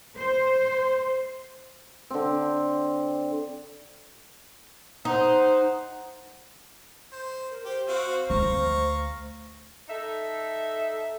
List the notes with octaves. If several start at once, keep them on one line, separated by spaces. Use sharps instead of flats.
C5
D3 C4
D#4 C5 F#5
C5
A#4
G4 C5
C4 F#4 F5
D2 A3 F5 A#5 C#6
D#4 A4 E5